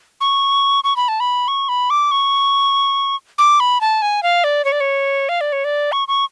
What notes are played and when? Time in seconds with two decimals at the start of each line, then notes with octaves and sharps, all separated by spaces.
0.21 C#6
0.84 C#6
0.96 B5
1.08 A5
1.20 B5
1.48 C#6
1.69 B5
1.90 D6
2.11 C#6
3.38 D6
3.60 B5
3.81 A5
4.02 G#5
4.23 F5
4.44 D5
4.65 C#5
4.72 D5
4.80 C#5
5.29 F5
5.41 D5
5.53 C#5
5.64 D5
5.92 C#6
6.08 C#6